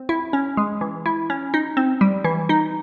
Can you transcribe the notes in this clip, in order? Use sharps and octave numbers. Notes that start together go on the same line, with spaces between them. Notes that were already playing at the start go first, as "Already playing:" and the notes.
Already playing: C4
E4
C#4
G#3
E3
E4
C#4
D#4
C4
G3
E3
D#4